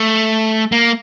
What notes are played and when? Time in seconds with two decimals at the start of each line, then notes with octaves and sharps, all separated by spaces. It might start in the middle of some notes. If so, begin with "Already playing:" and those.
Already playing: A3
0.72 A#3